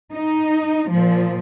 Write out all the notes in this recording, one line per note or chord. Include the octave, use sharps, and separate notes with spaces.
D#4
A#2 F3